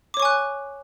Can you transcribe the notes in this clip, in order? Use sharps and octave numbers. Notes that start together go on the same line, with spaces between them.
C#5 G#5 C#6 D6 F#6